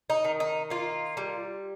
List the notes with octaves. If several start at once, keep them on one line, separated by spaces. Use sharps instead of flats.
D#4
D#3
D#4
A#3 F4
G3